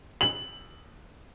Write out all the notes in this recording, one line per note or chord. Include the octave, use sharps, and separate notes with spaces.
F#7